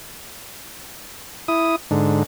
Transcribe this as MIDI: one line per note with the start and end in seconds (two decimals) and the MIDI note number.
1.48 1.76 64
1.48 1.76 87
1.91 2.23 44
1.91 2.23 50